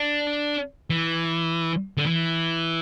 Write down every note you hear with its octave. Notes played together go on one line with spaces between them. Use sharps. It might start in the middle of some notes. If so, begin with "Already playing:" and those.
Already playing: D4
E3
D3
E3